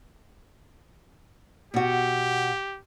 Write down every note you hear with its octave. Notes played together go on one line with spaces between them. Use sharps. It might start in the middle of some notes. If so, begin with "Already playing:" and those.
B2 F#4 G4